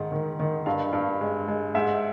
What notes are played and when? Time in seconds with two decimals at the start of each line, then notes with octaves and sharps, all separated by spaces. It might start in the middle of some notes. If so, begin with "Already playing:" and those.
Already playing: G#2 D#3
0.12 D#3
0.40 D#3
0.66 G2 F5
0.93 G2
1.21 G#3
1.48 G#3
1.75 G#2 E5